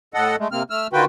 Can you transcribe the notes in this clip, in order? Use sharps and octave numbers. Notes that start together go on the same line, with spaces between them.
A2 A4 D#5 F#5
G#3 A3
C3 A#3 C4 F6
A3 E6 F6
D3 D#3 F4 F#4 B4 G5